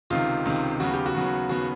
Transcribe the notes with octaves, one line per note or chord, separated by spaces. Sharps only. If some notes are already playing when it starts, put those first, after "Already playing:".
C#2 C3 D#3 F4
C#2 C3 D#3
D#2 C#3 F#3 B3 F#4
G4
F#4
D#2 C#3 F#3 B3
D#2 C#3 F#3 B3 F#4